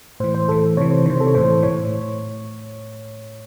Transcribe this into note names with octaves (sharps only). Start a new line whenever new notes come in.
A2 E3 C5
C5
A2 E3 A4
C3 E3 C#5
C5
C3 D#3 C5
A4
C#5
A2 E3 C5
A2 E3 C#5